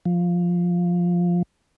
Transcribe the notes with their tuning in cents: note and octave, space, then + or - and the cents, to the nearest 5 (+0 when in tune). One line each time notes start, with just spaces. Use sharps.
F3 +5